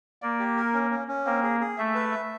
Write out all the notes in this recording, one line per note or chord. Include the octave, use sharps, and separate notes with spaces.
A#3 D5
G4
A#4
C#4
C#4
C#4
A#3 C4
G#4
G#4
A3 E5
B4
E5